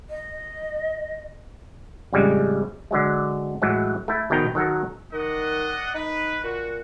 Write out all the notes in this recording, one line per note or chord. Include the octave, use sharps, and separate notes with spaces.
D#5
F2 A2 C#3 G3 G#3
D3 F#3 G#3
A2 E3 F#3 G#3
A3 E4
A#1 B2 D#3 G5 A#5
D#3 F#3 A4 A#4
D#3 D4 D#5 F#5
D#4 B4
A#2 F#4